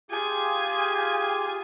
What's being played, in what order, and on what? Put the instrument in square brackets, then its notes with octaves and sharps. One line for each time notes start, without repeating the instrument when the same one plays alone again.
[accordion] F4 G4 G#4 [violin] G#5